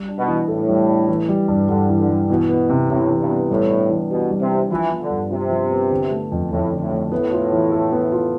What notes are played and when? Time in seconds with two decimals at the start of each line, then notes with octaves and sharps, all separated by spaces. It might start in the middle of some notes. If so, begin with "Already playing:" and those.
Already playing: G3
0.08 D4
0.18 B2
0.28 E3
0.48 A2 A4
0.69 G3
0.88 D4
1.08 E3
1.29 G3
1.48 G2
1.68 G2 D3
1.89 E3
1.99 D3
2.09 G3
2.29 B2 E3
2.49 B3
2.69 C3
2.89 A2 C3
3.09 E3
3.20 G2
3.30 B3
3.49 A2 G3
3.70 D4
3.89 E3
4.10 B2 G4
4.30 G3
4.40 C3
4.50 D4
4.70 E3 F3
4.90 B3
5.01 D3
5.10 G2
5.31 C3 F4
5.50 F3
5.70 B3
5.90 D3
6.11 A3
6.32 F2
6.51 F2 A2
6.72 D3
6.81 A2
6.91 A3
7.12 A2 B3
7.32 F4
7.52 E3
7.72 A4
7.92 B3
8.12 F4